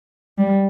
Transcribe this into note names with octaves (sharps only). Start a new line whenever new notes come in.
G3